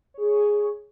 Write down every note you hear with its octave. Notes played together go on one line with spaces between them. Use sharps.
G#4 C#5